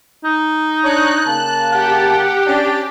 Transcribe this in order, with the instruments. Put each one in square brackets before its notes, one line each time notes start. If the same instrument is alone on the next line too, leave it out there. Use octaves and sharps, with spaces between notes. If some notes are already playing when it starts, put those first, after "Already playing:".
[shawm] D#4
[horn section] D4 C#5 [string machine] F#6
[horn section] C#3 A#3 A5
[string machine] G4 [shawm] F#5
[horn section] C#4 D4